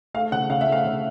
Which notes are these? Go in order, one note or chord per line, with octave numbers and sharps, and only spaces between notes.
A3 F5
C#3 F#5
C#3 F5
E5
A3
F5
C#3